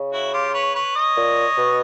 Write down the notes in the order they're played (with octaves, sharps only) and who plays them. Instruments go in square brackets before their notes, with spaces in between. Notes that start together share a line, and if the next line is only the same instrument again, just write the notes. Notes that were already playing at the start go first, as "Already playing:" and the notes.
Already playing: [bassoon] C#3
[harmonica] E4 F#4
F4 G4
B4 C#5
B4 C#5
C#5 D#5
[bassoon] A#2
B2